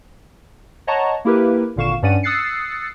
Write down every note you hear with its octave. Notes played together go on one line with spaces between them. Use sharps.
C#5 D#5 F#5 A5 A#5 C#6
A#3 E4 G4 A#4 B4
G#1 A#2 D3 F5 C#6 E7
G2 C#4 D5 F#5 D#7
D#6 E6 F#6 A6 C7 C#7